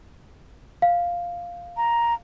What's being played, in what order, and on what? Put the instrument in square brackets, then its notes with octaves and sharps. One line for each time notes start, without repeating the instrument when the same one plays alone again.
[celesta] F5
[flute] A#5